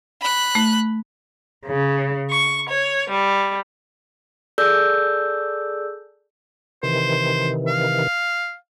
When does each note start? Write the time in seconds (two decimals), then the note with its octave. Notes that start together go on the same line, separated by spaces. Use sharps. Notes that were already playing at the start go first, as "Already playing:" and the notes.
0.21 B5 F#6
0.55 A3
1.67 C#3
2.30 C#6
2.69 C#5
3.08 G3
4.58 G#4 A4 D5 E6 G6
6.83 C3 D#3 E3 C5
7.67 F5